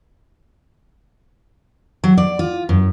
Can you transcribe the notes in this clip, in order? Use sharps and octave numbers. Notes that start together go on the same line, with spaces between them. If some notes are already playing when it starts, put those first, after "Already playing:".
F#3
D5
F4
F#2